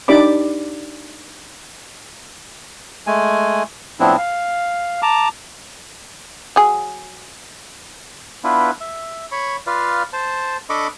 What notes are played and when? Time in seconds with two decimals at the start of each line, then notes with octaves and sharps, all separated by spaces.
0.08 D4 D#4 G4 D5 B5 D6
3.07 G#3 A3 G#5
4.00 A2 F3 B3 C4 D4 E4
4.18 F5
5.02 A5 A#5 D6
6.56 F#3 G#4
8.44 B3 D4 E4 F4 B4
8.81 E5
9.32 C#5 B5 C#6
9.67 F4 B4 D5 F5
10.13 C5 A5
10.70 D4 A4 D#5 B5 C#6 D6